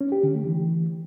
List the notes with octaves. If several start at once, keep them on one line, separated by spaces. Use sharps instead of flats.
C#4
G4
D3
A3
E3